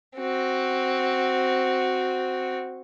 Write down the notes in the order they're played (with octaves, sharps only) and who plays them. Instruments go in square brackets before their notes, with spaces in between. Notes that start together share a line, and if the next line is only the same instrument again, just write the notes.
[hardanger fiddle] C4 F#4